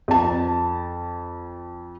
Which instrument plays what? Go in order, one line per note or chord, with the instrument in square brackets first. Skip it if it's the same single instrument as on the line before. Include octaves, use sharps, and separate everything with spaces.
[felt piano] F2 A5